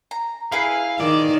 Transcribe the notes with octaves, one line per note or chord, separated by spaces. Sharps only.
A#5
E4 G#4 B4 F5
D#3 D5